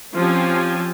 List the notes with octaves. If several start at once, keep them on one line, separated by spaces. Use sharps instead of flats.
F3 C4 C#4 F4 G4 G#5